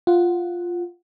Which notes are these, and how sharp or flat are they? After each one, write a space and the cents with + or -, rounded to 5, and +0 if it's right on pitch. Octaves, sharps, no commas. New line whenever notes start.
F4 +0 F#5 +0